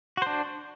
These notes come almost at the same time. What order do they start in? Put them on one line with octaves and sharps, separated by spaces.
F#4 C5 D4